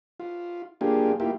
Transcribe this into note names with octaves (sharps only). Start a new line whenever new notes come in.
F4
A#3 D4 F4 G4 G#4
A#3 E4 F4 G4